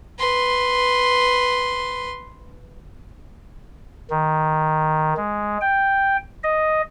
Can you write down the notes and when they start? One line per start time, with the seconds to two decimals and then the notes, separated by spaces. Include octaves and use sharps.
0.19 B4 C6
4.10 D#3
5.17 G#3
5.61 G5
6.44 D#5